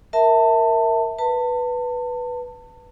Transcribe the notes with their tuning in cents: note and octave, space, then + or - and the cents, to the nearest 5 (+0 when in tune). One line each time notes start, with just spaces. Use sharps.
A#4 +0 E5 -15 A5 +20
B4 -5 A5 +30